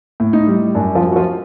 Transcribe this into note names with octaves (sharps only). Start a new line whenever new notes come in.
A2
D#4
G3
F#2 D4
F3 F4
F#3
F#4
F3 F4